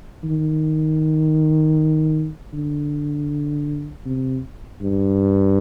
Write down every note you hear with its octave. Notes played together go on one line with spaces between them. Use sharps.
D#3
D3
C3
G2